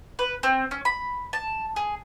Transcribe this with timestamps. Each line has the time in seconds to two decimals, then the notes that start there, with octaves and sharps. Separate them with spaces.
0.19 B4
0.43 C4
0.71 C#4
0.85 B5
1.33 A5
1.76 G#4